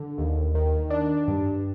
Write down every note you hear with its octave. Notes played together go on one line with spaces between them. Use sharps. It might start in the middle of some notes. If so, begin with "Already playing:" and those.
Already playing: D3
D#2
D#3
D4
G2